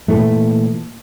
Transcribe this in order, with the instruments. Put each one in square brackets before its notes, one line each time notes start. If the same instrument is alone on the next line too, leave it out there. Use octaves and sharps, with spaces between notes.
[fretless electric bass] A#2 E3 A3